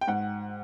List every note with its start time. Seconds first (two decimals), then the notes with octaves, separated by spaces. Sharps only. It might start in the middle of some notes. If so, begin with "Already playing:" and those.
0.01 G5
0.07 G#2 F#5